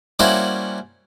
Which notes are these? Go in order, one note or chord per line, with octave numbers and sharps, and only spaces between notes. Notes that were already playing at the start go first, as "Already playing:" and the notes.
G3 A#3 C#4 E4 F#4 C5